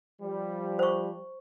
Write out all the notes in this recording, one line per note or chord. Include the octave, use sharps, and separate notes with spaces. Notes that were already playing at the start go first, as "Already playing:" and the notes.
F3 G3
C5 C#6